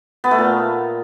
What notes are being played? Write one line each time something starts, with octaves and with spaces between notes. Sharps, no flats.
B3
A3
A#2